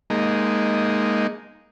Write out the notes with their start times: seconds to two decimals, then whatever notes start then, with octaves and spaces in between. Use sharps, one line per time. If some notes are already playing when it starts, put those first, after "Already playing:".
0.10 G#3 A#3 D#4